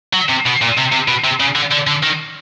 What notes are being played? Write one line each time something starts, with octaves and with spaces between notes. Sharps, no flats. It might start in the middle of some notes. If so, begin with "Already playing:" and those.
F#3
C3
B2
A#2
C3
C3
B2
C3
C#3
D3
D3
D3
D#3